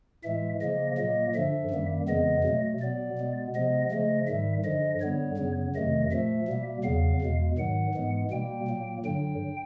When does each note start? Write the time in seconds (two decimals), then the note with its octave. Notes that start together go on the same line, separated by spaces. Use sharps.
0.24 A2 E3 G#3 E5
0.60 C#3 F3 A#3 D#5
0.98 A#2 F#3 A#3 D#5
1.35 G2 D3 F3 E5
1.71 F#2 D#3 G3 A#3
2.08 F2 C#3 E3 G#3 B3 D#5
2.44 B2 F#3 A3
2.81 B2 F#3 B3 D5
3.18 B2 G#3 B3
3.55 C3 F3 G#3 B3 D#5
3.91 C#3 F3 A3 D#5
4.28 G#2 D#3 G3 E5
4.64 G2 D3 F3 D#5
5.01 G2 D3 G3 B3 C#5
5.37 F#2 C#3 F#3 B3
5.75 F2 C3 D#3 F#3 A3 D#5
6.11 A#2 F3 A3 E5
6.48 B2 G3 A#3
6.84 E2 C#3 F#3 B3 F5
7.21 E2 B2 G#3
7.58 G#2 D#3 F#3 F#5
7.95 G#2 E3 G#3 B3
8.31 B2 G3 A#3 G5
8.68 A#2 F#3 A#3
9.05 G2 D3 F#3 G5